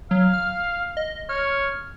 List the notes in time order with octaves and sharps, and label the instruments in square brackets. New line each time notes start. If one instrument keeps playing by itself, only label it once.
[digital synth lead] F#3 [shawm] F5
[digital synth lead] F6
D#5
[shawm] C#5 [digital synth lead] F6